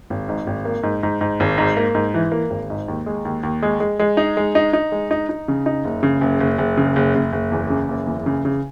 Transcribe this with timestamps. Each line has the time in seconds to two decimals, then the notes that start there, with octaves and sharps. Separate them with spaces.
0.10 G#1
0.29 G#2
0.47 G#1
0.65 A#3
0.83 G#2
1.03 G#2
1.21 G#2
1.40 G#1
1.58 G#2
1.77 A#3
1.95 G#2
2.14 E3
2.32 A#3
2.50 G#1
2.70 G#2
2.88 D#2
3.06 G#3
3.25 D#2
3.43 D#2
3.63 G#3
3.80 G#3
3.99 G#3
4.17 D#4
4.37 G#3
4.55 D#4
4.73 D#4
4.92 G#3
5.11 D#4
5.29 D#4
5.48 C#3
5.66 D#4
5.85 F#1
6.03 C#3
6.21 F#1
6.40 F#1
6.58 F#1
6.77 C#3
6.96 F#1
7.15 F#1
7.33 F#1
7.52 E2
7.70 C#3
7.89 F#1
8.07 E2
8.26 C#3
8.45 C#3